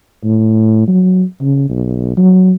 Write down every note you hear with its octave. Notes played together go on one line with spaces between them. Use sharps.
A2
F#3
C#3
B1
F#3